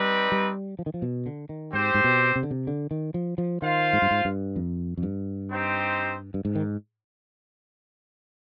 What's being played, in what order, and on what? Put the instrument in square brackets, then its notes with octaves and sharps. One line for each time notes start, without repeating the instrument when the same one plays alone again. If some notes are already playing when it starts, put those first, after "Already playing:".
Already playing: [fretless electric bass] G3 [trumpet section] C4 D#4 B4 D5
[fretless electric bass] G3
F3
D#3
F3
B2
D3
D#3
[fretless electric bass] G#2 [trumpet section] C4 G4 C5
[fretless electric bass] G#2
B2
C3
D3
C3
D3
D#3
F3
F3
[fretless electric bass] D#3 [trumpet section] F4 C5 F5
[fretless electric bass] G#2
G2
G#2
G2
F2
F2
G2
[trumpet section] C4 D#4 G4 C5
[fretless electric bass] G2
G#2
D#3